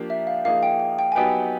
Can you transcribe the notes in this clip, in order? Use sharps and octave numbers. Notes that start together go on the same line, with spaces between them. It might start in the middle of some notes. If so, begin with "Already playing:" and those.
Already playing: F3 A#3 D4 G4
E5
F5
F3 A#3 D#4 G#4 F5
G5
G5
G5
G#5
F#3 B3 D#4 G4 B4 G5